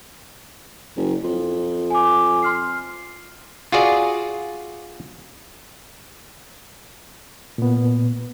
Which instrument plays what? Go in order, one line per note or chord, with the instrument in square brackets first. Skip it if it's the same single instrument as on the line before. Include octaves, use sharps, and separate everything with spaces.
[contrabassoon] F#1
F2
[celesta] G#5 D6
C6 F6 C7
[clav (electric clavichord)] F4 F#4 G#4 D5
[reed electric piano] A#2 B3